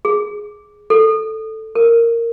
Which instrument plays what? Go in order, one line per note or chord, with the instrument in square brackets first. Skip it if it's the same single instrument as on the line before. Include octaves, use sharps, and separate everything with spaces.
[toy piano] G#4
A4
A#4